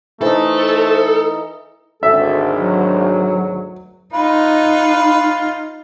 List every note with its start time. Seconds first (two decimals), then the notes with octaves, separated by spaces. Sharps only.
0.21 E3 A3 D#4 A4 C5
2.03 G#1 D2 A4 E5
2.57 F#3
4.14 D#4 F4 B4